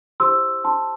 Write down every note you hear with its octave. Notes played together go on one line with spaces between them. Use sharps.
E4 G4 C5 C6 E6
A5 C6